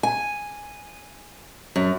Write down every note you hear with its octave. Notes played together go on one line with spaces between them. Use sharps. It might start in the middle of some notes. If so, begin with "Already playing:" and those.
G#5
F#2